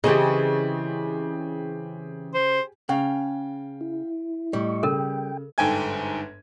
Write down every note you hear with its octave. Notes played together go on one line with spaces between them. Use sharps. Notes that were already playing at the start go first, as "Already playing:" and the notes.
C#3 E3 C4 G4 G#4 D#5
C5
C#3 F5 G5
E4
A2 G3 D#5 C#6
C#3 A4 A#4 G5
G1 G#2 A4 G5 G#5 G#6